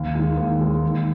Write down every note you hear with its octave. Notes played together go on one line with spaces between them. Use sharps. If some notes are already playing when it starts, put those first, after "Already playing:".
Already playing: D#2
D#3 G#3
D#2
D#3 G#3
D#2